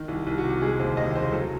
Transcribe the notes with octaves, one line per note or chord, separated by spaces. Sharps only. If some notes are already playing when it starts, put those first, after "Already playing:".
Already playing: D#3
C2
C2
F#4
C3
G#3 G#4
D#2 C5
D#2 D#5
C#3 C5
F#3 A4